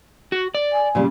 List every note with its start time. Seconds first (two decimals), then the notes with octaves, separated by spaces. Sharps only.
0.32 F#4
0.55 D5
0.73 G#5
0.95 A#2 C#3 G3